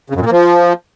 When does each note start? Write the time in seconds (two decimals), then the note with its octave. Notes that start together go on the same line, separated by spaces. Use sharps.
0.10 C#3
0.15 F#2
0.20 A#2
0.26 A#3
0.31 F3